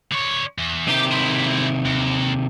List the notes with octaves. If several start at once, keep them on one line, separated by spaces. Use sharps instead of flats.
D3 C#5
E2
C3 D#3 G4
E4 C5
D#2